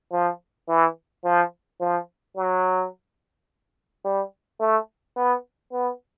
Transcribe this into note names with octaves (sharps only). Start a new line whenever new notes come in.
F3
E3
F3
F3
F#3
G3
A3
B3
B3